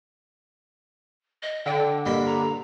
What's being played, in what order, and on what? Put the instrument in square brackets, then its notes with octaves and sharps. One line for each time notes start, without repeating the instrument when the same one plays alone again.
[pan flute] D#5
[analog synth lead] D3 [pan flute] G5
[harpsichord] G2 A#3 B5 [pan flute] D#5
[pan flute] A#5